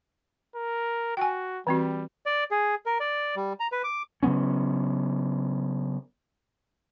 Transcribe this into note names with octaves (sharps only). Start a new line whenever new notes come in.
A#4
F#4 G5 G#5
E3 G3 C4 F#4
D5
G#4
A#4
D5
G3
A#5
B4
D6
C#3 F#3 B3 C#4